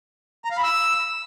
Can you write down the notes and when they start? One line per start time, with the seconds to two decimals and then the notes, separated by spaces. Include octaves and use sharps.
0.45 A#5
0.51 F5
0.57 B5
0.63 E6